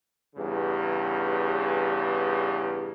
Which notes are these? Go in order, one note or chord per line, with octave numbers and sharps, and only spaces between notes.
E2 G2 C#3